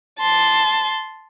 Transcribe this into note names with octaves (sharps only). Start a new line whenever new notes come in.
A5 C6